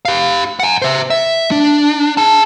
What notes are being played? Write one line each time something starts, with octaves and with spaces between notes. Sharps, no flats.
G4 F5
F#5 G#5
C5 E5
E5
D4
G#4 A5